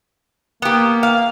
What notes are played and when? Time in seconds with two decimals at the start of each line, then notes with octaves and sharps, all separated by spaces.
0.62 A#3 B3 G4
1.03 F5